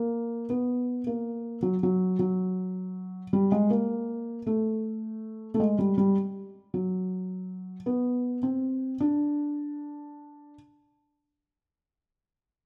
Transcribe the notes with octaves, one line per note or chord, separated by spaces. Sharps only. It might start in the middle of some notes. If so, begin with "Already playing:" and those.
Already playing: A#3
B3
A#3
F#3
F#3
F#3
G3
G#3
A#3
A3
A3
G#3
G3
G3
F#3
B3
C4
D4